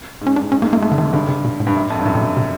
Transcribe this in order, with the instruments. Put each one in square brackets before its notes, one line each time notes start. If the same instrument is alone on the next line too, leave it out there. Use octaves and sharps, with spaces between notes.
[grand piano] G#2
[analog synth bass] C#4
[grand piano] G2 [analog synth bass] D4
[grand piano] G#2 [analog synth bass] C#4
[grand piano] G#2 [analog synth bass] A#3
[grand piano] F#2 [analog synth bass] A#3
[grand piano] F2 [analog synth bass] A3
[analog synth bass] D3
[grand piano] F#2 [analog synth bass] D#3
[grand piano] G#2
[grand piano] G2 [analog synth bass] D3
[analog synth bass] C#3
B2
A2
[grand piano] G2
F#2
F2
G2
[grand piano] F#2 [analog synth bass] A2
[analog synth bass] A#2
B2
C3